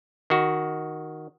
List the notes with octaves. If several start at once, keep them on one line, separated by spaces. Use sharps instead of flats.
D#3 F#4